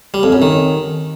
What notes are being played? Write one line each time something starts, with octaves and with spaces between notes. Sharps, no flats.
G3
F2
F#2
D#3